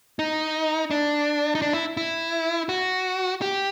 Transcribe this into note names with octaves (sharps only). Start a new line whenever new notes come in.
D#4
D4
D#4
D4
E4
E4
F#4
G4